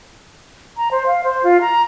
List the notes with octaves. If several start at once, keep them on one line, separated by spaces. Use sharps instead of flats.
A#5
C5
F5
C5
F4
A#5